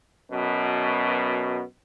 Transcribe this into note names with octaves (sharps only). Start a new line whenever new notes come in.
F#2 B2